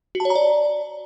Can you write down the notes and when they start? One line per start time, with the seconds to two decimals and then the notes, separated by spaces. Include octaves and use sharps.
0.15 F#4
0.20 A5
0.25 C#5
0.30 A#5
0.35 D5